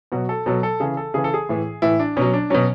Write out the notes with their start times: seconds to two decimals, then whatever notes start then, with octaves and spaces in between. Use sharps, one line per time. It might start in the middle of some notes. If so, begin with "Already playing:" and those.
0.12 B2 F#3 F#4
0.29 A4
0.46 B2 F#3 A4
0.63 A4
0.80 C#3 E3 G#4
0.97 A4
1.14 C#3 E3 G#4
1.24 A4
1.34 G#4
1.49 A2 E3
1.82 A2 E3 E4
1.99 D4
2.17 B2 F#3 C#4
2.33 D4
2.50 B2 F#3 C#4